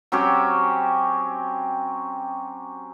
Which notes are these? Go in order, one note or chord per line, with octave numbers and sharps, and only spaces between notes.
F#3 C4 C#4 G4